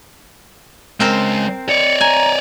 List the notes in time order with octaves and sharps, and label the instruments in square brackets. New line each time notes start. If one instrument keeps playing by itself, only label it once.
[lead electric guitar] C#2 G#3 [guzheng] C4 A#4 C5
[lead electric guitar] C#5 D5 [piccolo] C#7
[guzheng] G#5 [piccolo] A#5